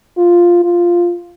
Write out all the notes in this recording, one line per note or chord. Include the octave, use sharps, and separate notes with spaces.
F4
F4